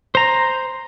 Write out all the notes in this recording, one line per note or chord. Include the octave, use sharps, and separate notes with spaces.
C5 A#5